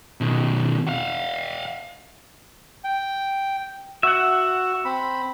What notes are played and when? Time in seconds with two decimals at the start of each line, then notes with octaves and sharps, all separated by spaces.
0.21 B2 D#3
0.87 F5 F#5
2.84 G5
4.03 F#4 E5 F#5
4.85 C4 B5